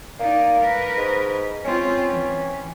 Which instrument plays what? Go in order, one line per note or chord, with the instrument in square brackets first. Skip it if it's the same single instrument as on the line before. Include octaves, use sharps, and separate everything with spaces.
[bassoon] A#3 [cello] D#4 D5
[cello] A#4 B4
[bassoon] G#2
[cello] C4 F4 [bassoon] C#4
[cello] E3